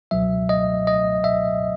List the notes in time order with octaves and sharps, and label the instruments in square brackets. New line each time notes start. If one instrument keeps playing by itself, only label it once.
[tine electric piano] C#2 B2 F#3 E5
D#5
D#5
E5